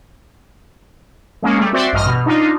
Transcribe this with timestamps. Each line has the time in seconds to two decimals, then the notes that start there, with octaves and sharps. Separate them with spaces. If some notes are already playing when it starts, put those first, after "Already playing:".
1.42 G#3 A#3 C#4
1.58 G3 A3
1.73 C4 F#4 C5 D5 E5 C6
1.93 A1 G2 D#5 F6
2.06 B2
2.26 D4 D#4 F4